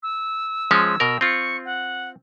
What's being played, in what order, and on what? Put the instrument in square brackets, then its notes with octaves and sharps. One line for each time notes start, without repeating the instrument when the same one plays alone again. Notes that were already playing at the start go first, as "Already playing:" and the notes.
[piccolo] E6
[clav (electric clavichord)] F3 G#3 C#4
B2 A#4
[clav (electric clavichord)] C4 F4 [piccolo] C#6
[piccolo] F#5